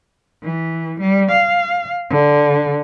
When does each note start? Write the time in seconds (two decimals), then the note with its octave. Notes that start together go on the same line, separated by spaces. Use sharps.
0.43 E3
1.00 G3
1.31 F5
2.10 D3